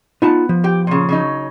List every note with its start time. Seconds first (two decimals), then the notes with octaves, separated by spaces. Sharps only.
0.22 B3 D#4 F4 A5
0.49 F3
0.64 G4 G5
0.87 A#2 C#3
1.09 C#3 F#3 D#4